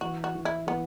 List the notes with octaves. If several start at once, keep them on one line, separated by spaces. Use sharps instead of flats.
E3 F#4
F#4
E3
E4
E3 B3